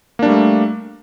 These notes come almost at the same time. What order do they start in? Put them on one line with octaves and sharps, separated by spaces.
A#3 D4 G3 A3